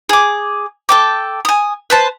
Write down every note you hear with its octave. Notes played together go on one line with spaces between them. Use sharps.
G#4 D6
A4 G5 D6
G#5 D#6
B4 C5 A5